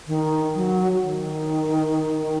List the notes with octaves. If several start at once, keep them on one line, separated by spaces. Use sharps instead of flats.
D#3
F#3
D#3